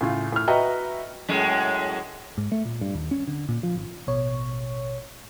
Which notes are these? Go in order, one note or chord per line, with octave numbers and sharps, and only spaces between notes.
A2 C#3 F4
A2 F6
F#4 B4 D#5 E5 G5 A#5
F#2 A2 G#3
G#2
A3
A#2
G2
D#2
C#4
D3
A#2
F3
G#1
A1 B2 C#5